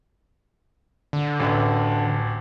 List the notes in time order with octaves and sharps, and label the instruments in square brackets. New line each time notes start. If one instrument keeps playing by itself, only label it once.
[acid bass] D3
[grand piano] A1 D2